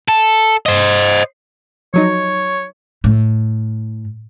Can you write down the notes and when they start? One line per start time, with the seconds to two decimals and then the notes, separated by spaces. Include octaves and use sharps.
0.08 A4
0.66 C5 D#5
1.94 F3 F#3 D#4 C#5
3.04 A2